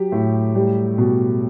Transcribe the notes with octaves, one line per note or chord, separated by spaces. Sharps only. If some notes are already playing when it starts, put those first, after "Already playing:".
Already playing: F#3 G4
A2
G3 G4
B2